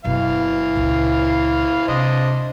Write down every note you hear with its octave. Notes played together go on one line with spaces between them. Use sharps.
F#1 B2 E3 F5
C#2 A#2
C3 D4 C5 D#5